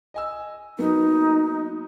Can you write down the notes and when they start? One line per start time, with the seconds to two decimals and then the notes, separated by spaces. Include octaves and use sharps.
0.14 D#5 G#5 E6
0.79 F#3 A#3 B3 D#4